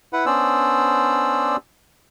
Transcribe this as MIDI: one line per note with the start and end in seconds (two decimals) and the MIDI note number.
0.13 0.26 64
0.13 0.26 71
0.13 0.26 78
0.26 1.56 59
0.26 1.56 61
0.26 1.56 62
0.26 1.56 72
0.26 1.56 74
0.26 1.56 88